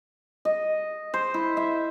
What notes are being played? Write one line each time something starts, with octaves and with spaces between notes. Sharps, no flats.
D#5
C5
E4
E5